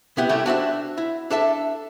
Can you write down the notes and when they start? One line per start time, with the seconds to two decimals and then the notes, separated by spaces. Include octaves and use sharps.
0.17 C3 B3 E4 G4 F#5
0.29 G3 A3 C#4 E4 G4
0.46 D4 F#4 C5 E5
0.98 E4
1.30 D4 A4 E5 A5